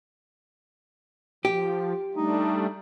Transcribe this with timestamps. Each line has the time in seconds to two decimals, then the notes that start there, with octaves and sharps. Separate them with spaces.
1.45 F3 G4
2.16 G3 A3 D4 D#4